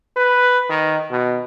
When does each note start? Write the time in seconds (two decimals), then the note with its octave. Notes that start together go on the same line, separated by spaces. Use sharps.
0.17 B4
0.70 D#3
1.11 B2